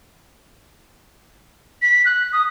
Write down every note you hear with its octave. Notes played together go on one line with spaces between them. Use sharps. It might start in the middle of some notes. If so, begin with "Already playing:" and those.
B6
F#6
D#6